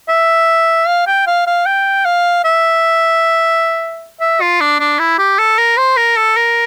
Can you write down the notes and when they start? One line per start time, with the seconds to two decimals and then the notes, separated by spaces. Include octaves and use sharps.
0.09 E5
0.87 F5
1.07 G5
1.27 F5
1.47 F5
1.66 G5
2.05 F5
2.44 E5
4.20 E5
4.41 F4
4.61 D4
4.80 D4
4.99 E4
5.18 G4
5.39 A4
5.58 A#4
5.77 C5
5.97 A#4
6.16 A4
6.37 A#4